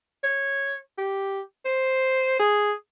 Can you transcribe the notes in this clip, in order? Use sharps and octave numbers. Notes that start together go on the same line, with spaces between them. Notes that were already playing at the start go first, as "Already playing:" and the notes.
C#5
G4
C5
G#4